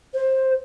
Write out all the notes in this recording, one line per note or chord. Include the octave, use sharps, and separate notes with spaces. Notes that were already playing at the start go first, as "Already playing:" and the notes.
C5